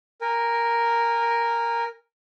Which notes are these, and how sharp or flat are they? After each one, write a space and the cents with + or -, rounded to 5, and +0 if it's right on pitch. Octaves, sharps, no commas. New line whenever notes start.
A#4 +0 G#5 -35